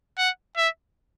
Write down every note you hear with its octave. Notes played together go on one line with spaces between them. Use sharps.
F#5
E5